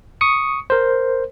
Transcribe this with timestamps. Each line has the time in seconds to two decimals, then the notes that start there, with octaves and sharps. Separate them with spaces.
0.21 C#6 D#6 C#7
0.70 A#4 C5